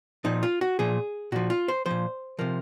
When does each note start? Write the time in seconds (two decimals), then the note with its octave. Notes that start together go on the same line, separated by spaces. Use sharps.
0.25 A#2 F3 D#4
0.43 F4
0.61 F#4
0.79 A#2 F3 G#4
1.32 A#2 F3 F#4
1.50 F4
1.68 C5
1.86 A#2 F3 C5
2.39 C3 F3 A#4